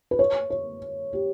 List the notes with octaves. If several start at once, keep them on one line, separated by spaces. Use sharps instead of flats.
B4
C#5
C#5
G4